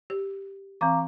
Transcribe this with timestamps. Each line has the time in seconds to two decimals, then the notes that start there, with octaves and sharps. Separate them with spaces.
0.10 G4
0.81 E3 C4 F5 A#5 D6